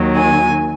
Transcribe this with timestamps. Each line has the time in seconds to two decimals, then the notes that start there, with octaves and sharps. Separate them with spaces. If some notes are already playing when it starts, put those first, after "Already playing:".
Already playing: D#2 D#3 F#3
0.15 G#5